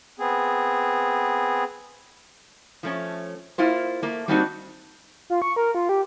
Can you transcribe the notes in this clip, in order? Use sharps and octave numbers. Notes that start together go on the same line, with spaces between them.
B3 C4 G#4
F3 A3 C#4
A#3 E4 F4 C5
A3 A#3
G3 A#3 C4 D4 D#4 F#4
F4
C#6
A#4
F4
G4